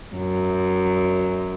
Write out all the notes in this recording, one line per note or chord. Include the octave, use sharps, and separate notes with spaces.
F#2